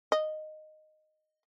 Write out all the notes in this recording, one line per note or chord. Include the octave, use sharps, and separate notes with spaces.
D#5